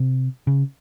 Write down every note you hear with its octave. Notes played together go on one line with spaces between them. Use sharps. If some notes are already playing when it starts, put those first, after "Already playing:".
Already playing: C3
C#3